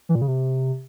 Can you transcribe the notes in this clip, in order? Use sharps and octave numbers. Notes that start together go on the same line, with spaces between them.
E3
A#2
C#3
C3